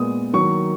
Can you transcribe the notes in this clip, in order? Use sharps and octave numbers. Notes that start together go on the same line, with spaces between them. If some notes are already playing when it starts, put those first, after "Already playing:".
Already playing: A#2 G#3 B3 D#6
D#3 F#3 A#3 C#6